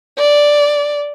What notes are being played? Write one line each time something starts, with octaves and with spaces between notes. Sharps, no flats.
D5